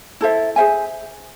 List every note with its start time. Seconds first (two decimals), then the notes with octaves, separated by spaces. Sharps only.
0.21 E4 A4 C5 E5
0.56 G#4 C5 E5 G#5